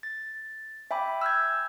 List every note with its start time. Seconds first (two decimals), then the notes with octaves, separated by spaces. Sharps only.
0.03 A6
0.91 E5 G5 G#5 B5 D6
1.21 E6 F6 G6 G#6